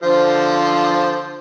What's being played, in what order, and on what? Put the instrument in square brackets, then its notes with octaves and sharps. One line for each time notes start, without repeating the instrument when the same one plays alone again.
[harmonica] D3 F3 C5